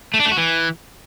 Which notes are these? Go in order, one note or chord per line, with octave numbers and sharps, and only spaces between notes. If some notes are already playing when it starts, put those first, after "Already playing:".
A3
D4
A3
F#4
E3